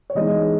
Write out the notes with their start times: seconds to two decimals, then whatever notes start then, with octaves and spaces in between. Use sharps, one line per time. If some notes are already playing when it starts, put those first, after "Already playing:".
0.10 C#5
0.15 E3 G#3 B3 D#4 D#5